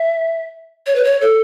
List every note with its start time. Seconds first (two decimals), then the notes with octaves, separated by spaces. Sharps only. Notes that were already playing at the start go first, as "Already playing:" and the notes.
Already playing: E5
0.87 C#5
0.95 B4
1.04 C#5
1.21 A4